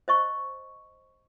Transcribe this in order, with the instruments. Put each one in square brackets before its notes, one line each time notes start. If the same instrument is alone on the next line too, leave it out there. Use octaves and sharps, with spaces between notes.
[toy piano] C5 D#5 C#6